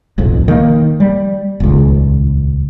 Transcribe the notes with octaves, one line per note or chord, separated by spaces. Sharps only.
D1 B1 F2
D#3 A#3
G3
D#1 C#2